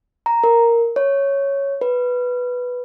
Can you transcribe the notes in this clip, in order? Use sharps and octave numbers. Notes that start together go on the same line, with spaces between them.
A#5
A#4
C#5
B4